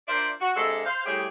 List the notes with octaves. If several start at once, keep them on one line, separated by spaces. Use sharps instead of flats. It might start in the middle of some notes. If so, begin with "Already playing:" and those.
D4 F4 A#4 C5 D5 E5
F#4
C3 G#3 A#3 D4 A4
C5 F5
A2 G3 G4 G#4